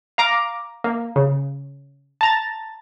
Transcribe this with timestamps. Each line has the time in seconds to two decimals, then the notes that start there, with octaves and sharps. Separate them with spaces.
0.18 F5 A#5 D6
0.84 A#3
1.16 C#3
2.21 A5 A#5 A6